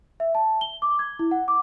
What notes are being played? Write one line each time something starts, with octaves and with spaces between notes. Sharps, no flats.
E5
A5
G7
D6
G#6
E4
F#5
D6